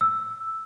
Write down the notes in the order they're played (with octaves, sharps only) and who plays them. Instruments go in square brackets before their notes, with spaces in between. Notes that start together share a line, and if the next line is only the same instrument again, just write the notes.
[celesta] E6